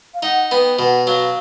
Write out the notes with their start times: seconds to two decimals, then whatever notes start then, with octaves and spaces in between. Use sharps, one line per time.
0.14 F5
0.23 D#4 F#5
0.51 B3 G5
0.79 B2 F#5
1.07 F#3 F5